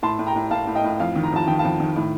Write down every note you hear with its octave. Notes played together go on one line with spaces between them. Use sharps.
A2 A5 C6
A2
G5 A#5
A2
A2 F5 A5
A2
D#5 G5
A2
F2 F5
D#3
A#5
F2 A5
D#3 G5
F2 F5 A5
D#3
A2